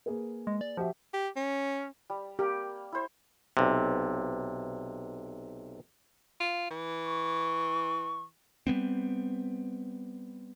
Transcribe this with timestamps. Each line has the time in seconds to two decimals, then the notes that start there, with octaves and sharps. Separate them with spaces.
0.06 A#3 G#4 B4
0.47 G#3
0.61 D5
0.77 F3 F#4 G4 E5
1.14 G4
1.36 C#4
2.10 G3
2.39 A#3 G4
2.92 E4 C5
3.57 B1 C3
6.40 F4
6.71 E3
7.05 C#6
8.67 G3 G#3 B3 C4